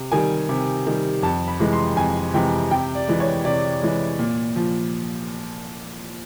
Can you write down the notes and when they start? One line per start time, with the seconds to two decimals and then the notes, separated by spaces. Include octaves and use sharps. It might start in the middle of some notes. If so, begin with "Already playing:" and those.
Already playing: C3
0.12 D#3 G3 G#5
0.49 C3
0.86 D#3 G3
1.22 F2 A5
1.48 B5
1.59 C3 E3 G#3
1.73 C6
1.96 F2 G#5
2.34 C3 E3 G#3 G5
2.71 C3 G5
2.95 D5
3.08 E3 G#3
3.20 C#5
3.44 C3 D5
3.82 E3 G#3
4.19 A#2
4.56 F3